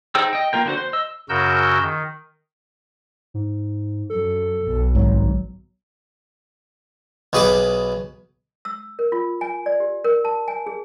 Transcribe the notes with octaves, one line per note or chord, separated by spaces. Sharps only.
D#4 G#4 C5 G5 E6
D#5 G5
A#3 F4 A#4 G5
D3 G#3 F#4 C5
C5
D#5 E6
F#2 C#3 F#4 A#4 E6 G6
D#3
G#2
F#2 A4
B1
G#1 G#2 F#3
B1 B2 G#4 B4 G#5 D6
E6
A#4
F4
G#5
D5
G4
A#4
A5
G#5
G#4